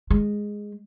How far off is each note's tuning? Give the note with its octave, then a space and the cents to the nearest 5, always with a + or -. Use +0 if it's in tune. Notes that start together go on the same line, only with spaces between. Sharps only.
G#3 -5